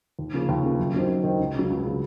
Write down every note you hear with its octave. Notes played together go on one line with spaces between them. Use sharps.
D#2
C#3 F3 A#3
D#2
C#3 F3 A#3
F#2
D#3 F#3 C4
F#2
D#3 F#3 C4
C#2
C#3 F#3
C#2
C#3 F#3